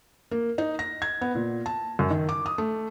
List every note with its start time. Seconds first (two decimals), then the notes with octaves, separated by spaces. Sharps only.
0.31 A#3
0.58 D#4
0.79 A#6
1.02 G#6
1.21 B3
1.35 A#2
1.66 A5
1.99 F#2
2.10 D#3
2.29 D6
2.46 D#6
2.58 A3